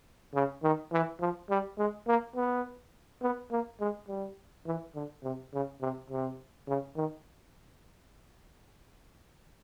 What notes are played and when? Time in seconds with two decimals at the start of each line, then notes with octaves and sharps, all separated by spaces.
0.34 C#3
0.63 D#3
0.92 E3
1.20 F3
1.50 G3
1.78 G#3
2.07 A#3
2.36 B3
3.22 B3
3.51 A#3
3.80 G#3
4.08 G3
4.66 E3
4.95 D3
5.24 C3
5.53 C#3
5.81 C3
6.10 C3
6.68 C#3
6.96 D#3